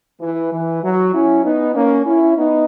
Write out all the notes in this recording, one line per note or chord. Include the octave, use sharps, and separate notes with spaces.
E3
E3
F#3
C#4 E4
B3 D#4
A#3 C#4
C#4 E4
B3 D#4